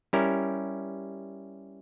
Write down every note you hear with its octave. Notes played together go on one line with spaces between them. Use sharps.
G3 C#4 E4 A#4